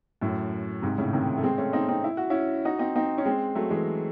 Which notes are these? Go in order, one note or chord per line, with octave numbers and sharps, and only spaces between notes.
F#2 A2
G#2 C3
A2 C#3
C3 D#3
A3
G#3 C4
A3 C#4
C4 D#4
C4 D#4
E4
F#4
C#4 E4
D#4 F#4
C4 D#4
C4 D#4
C#4
G#3 C4
F#3 A3
E3 G#3